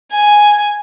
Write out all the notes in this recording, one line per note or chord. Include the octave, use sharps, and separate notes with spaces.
G#5